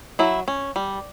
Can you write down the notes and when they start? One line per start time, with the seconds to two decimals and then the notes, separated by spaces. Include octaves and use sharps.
0.19 F#3 E4
0.48 C#4
0.76 G3